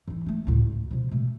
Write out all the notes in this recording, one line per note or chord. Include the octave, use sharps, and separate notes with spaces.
E3 D#4
A3 D#4
D2 A2
E4
B2 F3
B2 A3